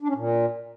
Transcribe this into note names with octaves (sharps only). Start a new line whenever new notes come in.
D4
C#4
A#2